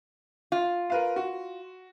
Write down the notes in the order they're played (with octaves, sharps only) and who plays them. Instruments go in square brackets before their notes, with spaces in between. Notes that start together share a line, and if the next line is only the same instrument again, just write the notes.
[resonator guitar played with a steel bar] F4
[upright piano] A#4 B4 F5
F#4